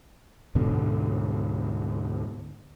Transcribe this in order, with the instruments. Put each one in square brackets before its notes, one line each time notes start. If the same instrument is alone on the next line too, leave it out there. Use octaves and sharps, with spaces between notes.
[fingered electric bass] D2 G#2 B2 D3